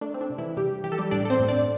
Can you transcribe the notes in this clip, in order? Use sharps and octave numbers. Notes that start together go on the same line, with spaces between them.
A3 D4
C4
D4
C3
E3 E4
C3 G3 G4
E3 G4
A4
G3 G4
A2 D4 D5
A4
C4 C5
A2
D4 D5